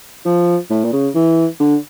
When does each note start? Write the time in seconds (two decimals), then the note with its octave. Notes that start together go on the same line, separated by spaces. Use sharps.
0.25 F3
0.70 A2
0.84 A#2
0.93 C#3
1.15 E3
1.60 D3